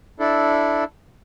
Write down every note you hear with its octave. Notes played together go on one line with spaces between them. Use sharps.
D4 E4 A4